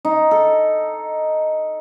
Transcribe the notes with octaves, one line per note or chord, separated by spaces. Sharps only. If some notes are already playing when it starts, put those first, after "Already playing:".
D#4
A4